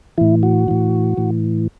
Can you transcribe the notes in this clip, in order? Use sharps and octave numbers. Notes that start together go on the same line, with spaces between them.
A2 E3 E4
F#4
A2 E3
A2 E3